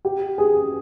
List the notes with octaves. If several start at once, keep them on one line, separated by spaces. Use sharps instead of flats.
G4
G#4